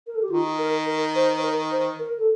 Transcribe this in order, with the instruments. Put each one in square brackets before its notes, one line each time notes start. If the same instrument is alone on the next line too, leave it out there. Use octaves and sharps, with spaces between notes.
[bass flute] A#4
A4
G4
[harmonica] D#3 [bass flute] F4
[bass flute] A#4
A#4
C5
C5
A#4
C5
A#4
A4